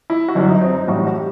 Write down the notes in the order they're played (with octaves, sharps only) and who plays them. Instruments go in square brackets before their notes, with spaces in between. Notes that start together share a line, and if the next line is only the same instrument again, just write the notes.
[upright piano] E4
F#4
G1 F#2 F#3 E4
D#4
C4
D#4
A1 A2 G3 F#4
F#4
G4